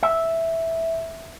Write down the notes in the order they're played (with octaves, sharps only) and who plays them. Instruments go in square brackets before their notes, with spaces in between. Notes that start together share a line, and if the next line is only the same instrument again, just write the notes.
[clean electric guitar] E5